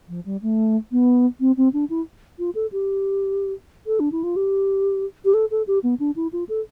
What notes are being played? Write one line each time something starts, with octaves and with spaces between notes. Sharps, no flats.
F3
G3
A3
B3
C4
C4
D4
E4
F4
A4
G4
A4
D4
E4
F4
G4
G4
A4
A4
G4
B3
D4
E4
F4
A4